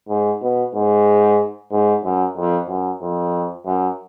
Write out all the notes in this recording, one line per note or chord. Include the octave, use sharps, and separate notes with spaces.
G#2
B2
G#2
G#2
F#2
F2
F#2
F2
F#2